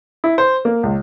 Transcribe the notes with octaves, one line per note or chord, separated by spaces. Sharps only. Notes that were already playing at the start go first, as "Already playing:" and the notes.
E4
C5
A#3
C#2